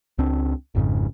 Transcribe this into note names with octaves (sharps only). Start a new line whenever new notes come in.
C#2 C4 D4
G#1 F2 G#2 C#3